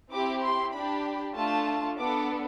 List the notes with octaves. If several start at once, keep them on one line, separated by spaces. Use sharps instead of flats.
C4 E4 G4 D6
C6
D4 G4 B5
A3 D4 F4 A5
B3 D4 A4 D6